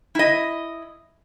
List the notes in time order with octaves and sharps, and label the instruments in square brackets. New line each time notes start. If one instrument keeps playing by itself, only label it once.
[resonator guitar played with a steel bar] E4 D#5